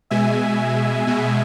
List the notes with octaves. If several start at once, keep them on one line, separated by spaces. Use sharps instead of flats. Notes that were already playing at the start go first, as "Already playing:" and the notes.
B2 G#3 E5 G#5
B2 G#3